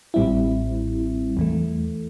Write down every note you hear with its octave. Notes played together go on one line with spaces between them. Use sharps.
A1 A2 G3 C4 E4
E2 E3 A3